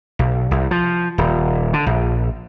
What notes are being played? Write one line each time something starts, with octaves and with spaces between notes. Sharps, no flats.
B1
C2
F3
D#1
D3
A#1